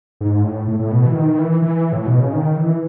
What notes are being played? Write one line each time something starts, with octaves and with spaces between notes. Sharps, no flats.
G#2
A2
A2
A2
B2
E3
D#3
E3
E3
A2
B2
C#3
D#3
E3